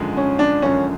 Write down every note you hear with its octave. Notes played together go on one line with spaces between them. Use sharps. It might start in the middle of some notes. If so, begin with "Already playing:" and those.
Already playing: G#1 F#2 D3 F3 G#3
C#4
D4
G#1 F#2 D3 F3 G#3 C#4